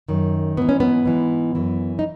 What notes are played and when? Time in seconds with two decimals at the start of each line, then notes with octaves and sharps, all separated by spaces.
0.09 F#2 D#3
0.57 G#2 E3 B3
0.69 C#4
0.80 B3
1.05 G#2 E3
1.55 F#2 E3
1.99 D#4